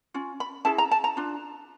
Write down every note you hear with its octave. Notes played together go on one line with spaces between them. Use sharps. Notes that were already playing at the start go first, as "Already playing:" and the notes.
C#4 F4
B5
C#4 E4 G#4 A5
A#5
A5
A#5
D4 F4